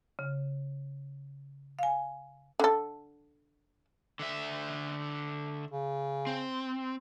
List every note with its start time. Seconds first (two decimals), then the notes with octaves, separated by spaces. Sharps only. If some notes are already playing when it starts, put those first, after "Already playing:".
0.19 C#3
1.79 F5 G#5
2.59 D3 A4
4.19 D3 E5
5.71 C#3
6.27 C4